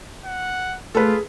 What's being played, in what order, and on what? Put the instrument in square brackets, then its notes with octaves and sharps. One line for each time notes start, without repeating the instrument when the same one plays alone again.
[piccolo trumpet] F#5
[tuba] A3 [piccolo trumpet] F4 [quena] G#4 [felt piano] A4 B4